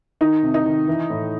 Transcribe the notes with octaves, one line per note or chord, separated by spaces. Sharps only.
D#3 D#4
C3
D#4
D#3
E3
A2